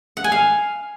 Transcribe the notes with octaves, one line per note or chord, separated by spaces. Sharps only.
F#5
G#5
F5